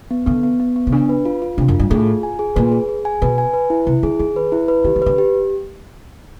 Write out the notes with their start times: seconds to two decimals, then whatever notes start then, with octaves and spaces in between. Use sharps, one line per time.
0.11 B3
0.27 D3 B3
0.43 B3
0.60 B3
0.76 B3
0.87 C3
0.92 C#3 D4
1.09 B4
1.25 F4
1.42 F4
1.57 C3 D4
1.68 F#2
1.74 F4
1.79 G2
1.91 A2 G#4
2.07 F4
2.23 G#5
2.39 G#4
2.56 A#2 B4
2.72 G#4
2.89 G#4
3.05 G#5
3.22 B2 B4
3.38 G#5
3.53 B4
3.70 E4
3.87 C3 E4
4.03 D3 G#4
4.20 D#3 G#4
4.36 B4
4.52 E4
4.68 B4
4.84 D#3 G4
4.96 E3
5.02 D3 B4
5.18 G4